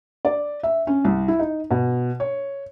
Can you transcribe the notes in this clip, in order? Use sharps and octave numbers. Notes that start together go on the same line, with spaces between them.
D5
E5
C#4
C2
E4
D#4
B2
C#5